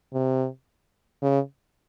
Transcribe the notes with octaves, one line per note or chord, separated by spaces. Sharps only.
C3
C#3